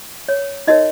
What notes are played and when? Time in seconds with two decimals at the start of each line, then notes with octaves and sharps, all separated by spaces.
0.28 C#5
0.67 D#4 F#4 A#4 C#5 D#5